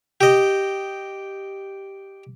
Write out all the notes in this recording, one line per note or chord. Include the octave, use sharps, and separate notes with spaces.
G4 D#5